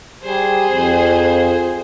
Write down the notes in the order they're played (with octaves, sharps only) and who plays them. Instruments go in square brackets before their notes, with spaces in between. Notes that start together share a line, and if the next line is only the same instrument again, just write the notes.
[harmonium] G3 [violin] G#4 C5
[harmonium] F2